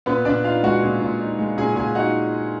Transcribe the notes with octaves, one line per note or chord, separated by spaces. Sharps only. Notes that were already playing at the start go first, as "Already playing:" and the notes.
A#2 B3 B4
A#2 D4 D5
D#4 F4 F5
G#3 F#4 F#5
A#2
A#2
D#4
G#3
A#2 G#4 G#5
A#2 G#4 G#5
D#4 F#4 F#5